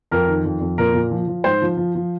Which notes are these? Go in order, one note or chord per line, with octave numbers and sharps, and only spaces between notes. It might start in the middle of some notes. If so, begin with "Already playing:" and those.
F2 A#4
D#3
F2
F2
A#2 A#4
A#2
F3
F3
G#2 C5
F3
F3
F3